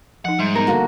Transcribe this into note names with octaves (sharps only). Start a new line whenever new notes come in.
F3 D#4 F#5
G#2 G3 C6
B3 D#4 A#4
D3 A#3 F#4